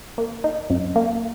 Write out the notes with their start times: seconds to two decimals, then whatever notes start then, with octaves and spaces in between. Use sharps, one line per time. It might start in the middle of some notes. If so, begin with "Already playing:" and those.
0.18 A#3
0.44 D#4
0.70 F#2
0.96 A#3